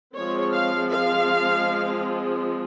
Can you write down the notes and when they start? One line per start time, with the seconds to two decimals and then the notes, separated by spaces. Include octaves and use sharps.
0.15 F3 G#3 C4 C#5
0.53 F5
0.92 F5